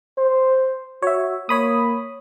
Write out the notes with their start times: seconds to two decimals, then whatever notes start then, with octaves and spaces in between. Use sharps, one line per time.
0.18 C5
1.02 F#4 C#5 E5
1.49 A#3 C#5 B5 D#6